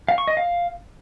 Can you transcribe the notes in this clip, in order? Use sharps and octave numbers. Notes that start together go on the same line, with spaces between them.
F5
C#6
D#5
F5